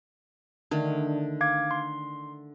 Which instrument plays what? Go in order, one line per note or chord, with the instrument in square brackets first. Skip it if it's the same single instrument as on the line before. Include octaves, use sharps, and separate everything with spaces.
[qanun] D3 D#3 A3 [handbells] D4
[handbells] F5 D6 G#6
C6